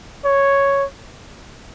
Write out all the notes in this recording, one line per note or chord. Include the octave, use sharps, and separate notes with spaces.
C#5